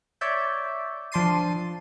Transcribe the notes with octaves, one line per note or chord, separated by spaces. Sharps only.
C#5 D5 E5 G6
F3 D4 C6 A6 C7 D#7